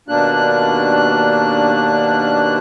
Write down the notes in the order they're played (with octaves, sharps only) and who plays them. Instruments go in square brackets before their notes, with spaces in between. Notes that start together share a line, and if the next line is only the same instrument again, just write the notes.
[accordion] D#2 B2 A#3 D4 F#6